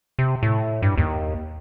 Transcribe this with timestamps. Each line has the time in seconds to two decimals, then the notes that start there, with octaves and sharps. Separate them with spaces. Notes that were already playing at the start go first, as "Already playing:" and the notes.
0.19 C3
0.43 A2
0.82 G2
0.98 D#2